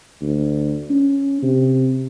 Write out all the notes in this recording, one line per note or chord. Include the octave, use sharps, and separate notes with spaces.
D2
C#4
C3